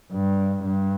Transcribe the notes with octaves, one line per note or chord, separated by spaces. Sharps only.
G2
G2